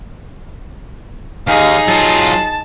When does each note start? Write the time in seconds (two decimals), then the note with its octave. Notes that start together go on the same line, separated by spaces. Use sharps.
1.47 D#2 D#4 G#4 F5
1.88 F#3 F4 A5